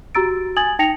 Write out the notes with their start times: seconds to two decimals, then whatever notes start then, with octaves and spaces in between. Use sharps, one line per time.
0.15 F#4 G4 A#5 E6 A6 D7
0.57 G#5 D#6 G#6 A6 F#7
0.79 D#4 G5 A5 A#6 C#7 F7